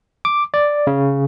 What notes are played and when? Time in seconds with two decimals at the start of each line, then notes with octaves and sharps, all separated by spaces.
0.25 D6
0.54 D5
0.87 C#3